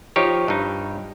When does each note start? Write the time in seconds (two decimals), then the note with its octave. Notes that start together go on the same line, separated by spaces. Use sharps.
0.16 F3 D#4 G4 C#5
0.48 G2 D#4